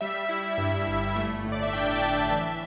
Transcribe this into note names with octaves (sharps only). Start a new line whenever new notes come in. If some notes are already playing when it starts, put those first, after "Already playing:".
G3 E5
E4
G2
G1
A3
A2
D5
E5
D4 G5
A5
A2
E5
E3 E5